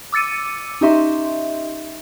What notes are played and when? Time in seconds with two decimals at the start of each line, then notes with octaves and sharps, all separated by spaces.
0.12 D6 E6 A6 C#7 D#7
0.81 C#4 D#4 G4 D#5 E5 C6